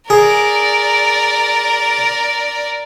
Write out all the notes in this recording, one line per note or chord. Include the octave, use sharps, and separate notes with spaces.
G#4 A#4 D5